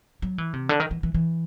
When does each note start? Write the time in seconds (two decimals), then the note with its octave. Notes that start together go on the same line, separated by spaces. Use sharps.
0.22 F#3
0.38 E3
0.53 C3
0.69 D3
0.80 D#3
0.91 E3
1.03 E3
1.14 E3